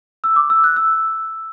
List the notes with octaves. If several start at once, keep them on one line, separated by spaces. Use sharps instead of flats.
E6
D6
E6
F#6
E6